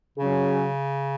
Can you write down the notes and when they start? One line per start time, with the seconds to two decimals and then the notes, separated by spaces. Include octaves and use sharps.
0.17 C#3 F#3 C#4 G#4